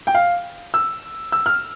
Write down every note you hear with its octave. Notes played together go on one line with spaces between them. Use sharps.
G5
F5
E6
E6
F6